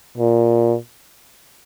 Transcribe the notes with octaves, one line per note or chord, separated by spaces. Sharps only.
A#2